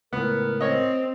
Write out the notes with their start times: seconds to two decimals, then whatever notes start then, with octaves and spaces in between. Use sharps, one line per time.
0.13 C#2 A2 B3 A#4
0.61 C4 C#5 D#5